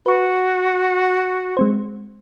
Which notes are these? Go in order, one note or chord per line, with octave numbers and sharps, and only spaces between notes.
F#4 B4 C#6
G#3 C4 C5